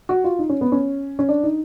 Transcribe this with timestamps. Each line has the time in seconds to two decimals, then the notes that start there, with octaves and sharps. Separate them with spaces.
0.09 F#4
0.24 F4
0.39 D#4
0.49 C#4
0.61 B3
0.72 C#4
1.19 C#4
1.29 D4
1.43 D#4